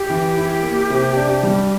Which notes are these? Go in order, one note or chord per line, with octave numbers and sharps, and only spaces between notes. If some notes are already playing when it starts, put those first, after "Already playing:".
Already playing: G4
E3
E4
A#3
C3
D4
G3